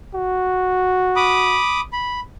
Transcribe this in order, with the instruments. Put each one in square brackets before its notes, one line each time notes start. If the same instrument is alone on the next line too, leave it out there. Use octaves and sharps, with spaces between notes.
[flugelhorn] F#4
[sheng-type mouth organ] B5 D6 D#6
B5